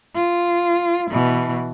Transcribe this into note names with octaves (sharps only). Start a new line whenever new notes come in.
F4
B2 E3